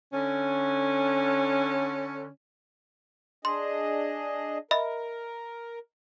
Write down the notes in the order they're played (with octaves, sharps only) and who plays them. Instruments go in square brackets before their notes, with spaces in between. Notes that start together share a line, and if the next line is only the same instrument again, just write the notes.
[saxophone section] D3 C#4
[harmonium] D4 G#4 D#5 [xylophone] C6
[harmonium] A#4 [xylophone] D#5 E5 B5